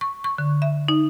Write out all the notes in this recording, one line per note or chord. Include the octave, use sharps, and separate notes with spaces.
C#6
C#6
D3
E5
D#4